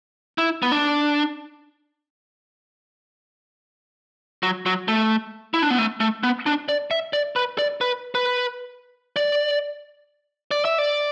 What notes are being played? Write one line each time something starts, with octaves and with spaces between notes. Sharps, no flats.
E4
B3
D4
F#3
F#3
A3
E4
D4
B3
A3
A3
B3
D4
D5
E5
D5
B4
D5
B4
B4
D5
D5
E5
D5